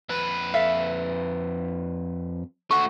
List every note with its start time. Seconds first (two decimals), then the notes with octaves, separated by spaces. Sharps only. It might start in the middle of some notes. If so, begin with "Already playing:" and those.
0.09 F2 B4
0.54 A4 E5 F5
2.71 A3 F#4 C#6